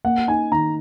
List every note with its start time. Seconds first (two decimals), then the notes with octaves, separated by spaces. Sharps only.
0.05 A#3 F#5
0.28 D#4 G#5
0.52 D#3 A#5